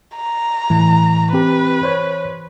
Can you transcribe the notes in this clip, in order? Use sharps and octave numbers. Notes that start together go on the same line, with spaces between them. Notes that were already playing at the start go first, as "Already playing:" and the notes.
A#5
A2 E3
C4 G4 B4
C5 C#5